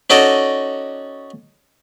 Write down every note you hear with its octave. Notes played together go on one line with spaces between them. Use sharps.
C#4 D#4 F#4 A4 D5 D#5